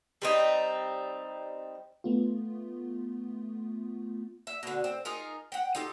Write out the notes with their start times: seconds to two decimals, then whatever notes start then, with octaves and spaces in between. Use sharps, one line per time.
0.22 G3 C4 D#4
2.04 A3 B3 F4
4.47 E5
4.63 B2 D3
4.84 C4
5.05 D#4 F4 G#4 A#4
5.52 F#5 G5
5.75 D#4 F4 G4 A4